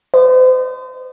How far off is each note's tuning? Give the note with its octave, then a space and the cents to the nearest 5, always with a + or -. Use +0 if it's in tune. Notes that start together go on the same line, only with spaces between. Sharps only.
C5 -40 D#5 -35